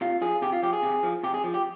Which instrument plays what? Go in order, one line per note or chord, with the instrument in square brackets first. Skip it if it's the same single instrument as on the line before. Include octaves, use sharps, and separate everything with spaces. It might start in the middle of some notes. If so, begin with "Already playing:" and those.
[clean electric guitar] C3 F4
F3 G#4
C3 G4
F4
F3 G4
G#4
C3
F3
C3 G4
G#4
F3
G4